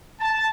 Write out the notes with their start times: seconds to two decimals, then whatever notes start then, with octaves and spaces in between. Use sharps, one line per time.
0.21 A5